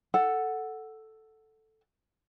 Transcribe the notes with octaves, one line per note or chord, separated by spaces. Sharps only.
A4 F#5